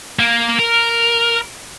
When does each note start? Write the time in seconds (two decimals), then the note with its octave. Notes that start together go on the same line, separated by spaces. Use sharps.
0.19 A#3
0.59 A#4